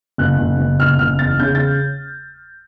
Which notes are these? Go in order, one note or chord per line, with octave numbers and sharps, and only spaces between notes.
F#1 F#6
F#1
F#1
F#1 F6
F#1 F6
E2 A6
C#3 G6
A6